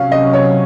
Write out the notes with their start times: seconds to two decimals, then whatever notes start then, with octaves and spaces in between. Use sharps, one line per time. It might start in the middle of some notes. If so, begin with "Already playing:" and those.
Already playing: C3 F#3 C#4 F5
0.12 D#5
0.33 C#5